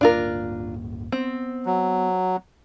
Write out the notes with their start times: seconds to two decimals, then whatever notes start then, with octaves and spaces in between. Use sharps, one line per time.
0.01 D1 G1 A#3 D4 F4 A#4
1.12 B3 C4
1.66 F#3